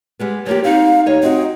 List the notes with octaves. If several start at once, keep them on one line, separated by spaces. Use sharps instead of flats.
G3 G#3 B3
F3 A#3 G4 C#5
C4 D#4 F5
D#2 C#5 D#5
C4 F#4 D#5